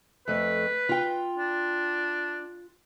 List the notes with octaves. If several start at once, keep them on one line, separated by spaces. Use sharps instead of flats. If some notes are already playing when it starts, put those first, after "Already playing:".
F2 A3 B4
F4 G5
D4